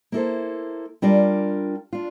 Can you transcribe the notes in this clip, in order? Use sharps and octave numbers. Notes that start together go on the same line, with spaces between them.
A#3 E4 A4 C5
G3 D4 F4 A#4 D5
D4 F4